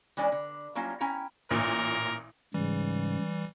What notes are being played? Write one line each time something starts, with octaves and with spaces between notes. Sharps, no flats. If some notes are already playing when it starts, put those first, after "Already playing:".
E3 G#3 C#4 D4 D5
D3
F#3 G3 A#3 C#4 E4 F4
C#4 E4 G5 A#5
A1 A#2 A#4
G#2 C#3 E3 G3